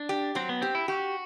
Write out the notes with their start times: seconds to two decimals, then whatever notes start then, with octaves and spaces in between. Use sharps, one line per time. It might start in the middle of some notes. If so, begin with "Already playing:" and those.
Already playing: D4
0.09 G4
0.35 F#3 C4
0.49 B3
0.62 C4 G4
0.75 E4
0.88 F#4 G4